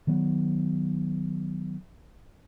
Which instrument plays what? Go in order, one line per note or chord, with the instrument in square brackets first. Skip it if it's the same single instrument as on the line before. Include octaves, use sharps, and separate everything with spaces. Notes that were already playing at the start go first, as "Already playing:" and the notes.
[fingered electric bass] D#3 F#3 B3